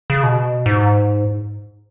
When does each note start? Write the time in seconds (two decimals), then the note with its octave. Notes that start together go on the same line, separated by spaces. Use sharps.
0.10 C#3
0.23 B2
0.66 G#2